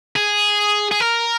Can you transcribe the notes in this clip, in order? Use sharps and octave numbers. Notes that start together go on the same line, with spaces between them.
G#4
G#4
A#4